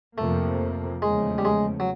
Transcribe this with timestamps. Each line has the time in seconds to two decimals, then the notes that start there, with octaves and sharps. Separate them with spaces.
0.18 F2 C3 F3 A3 A#3
1.02 E2 C#3 F3 G#3 A3
1.38 G3
1.45 G#3
1.80 F#3